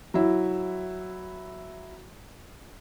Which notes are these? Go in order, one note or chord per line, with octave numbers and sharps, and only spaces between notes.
F#3 E4